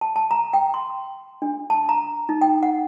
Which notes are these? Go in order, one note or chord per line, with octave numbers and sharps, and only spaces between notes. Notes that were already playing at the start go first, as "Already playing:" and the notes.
A5
A5
A#5
G5
C6
D4
A5
A#5
D#4
G5
F#5